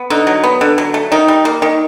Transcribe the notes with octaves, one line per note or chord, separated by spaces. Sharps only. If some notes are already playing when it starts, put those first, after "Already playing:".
Already playing: B3
D3 D#4
F#3
B3
D3
F#3
A3
D#3 D#4
G3
A#3
D#3